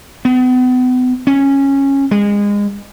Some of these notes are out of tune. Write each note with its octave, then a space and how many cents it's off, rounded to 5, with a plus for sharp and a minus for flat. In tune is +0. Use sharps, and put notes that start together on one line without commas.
B3 +35
C#4 -10
G#3 -25